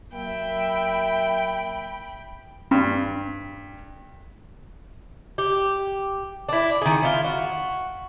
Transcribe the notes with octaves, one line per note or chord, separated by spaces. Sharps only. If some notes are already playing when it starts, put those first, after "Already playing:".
F#3 A#3 E5 G5 B5
G2
G4
D4 E4
D#3 G#4
E4 F4
F#4